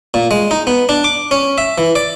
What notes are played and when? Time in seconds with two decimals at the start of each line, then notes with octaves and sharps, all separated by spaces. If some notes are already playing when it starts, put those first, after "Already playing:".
0.14 A#2
0.31 G#3
0.51 D#4
0.67 B3
0.89 D4
1.04 D6
1.31 C#4
1.58 E5
1.78 E3
1.95 D5